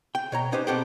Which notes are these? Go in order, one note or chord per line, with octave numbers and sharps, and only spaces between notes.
G5
B2 C#5 A#5
C#4 D#4 G4 B4 C5
B2 C4 G4 A4 F#5 G5